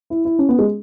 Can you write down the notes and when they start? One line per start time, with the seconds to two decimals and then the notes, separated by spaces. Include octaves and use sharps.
0.10 E4
0.25 E4
0.39 C#4
0.49 B3
0.59 G#3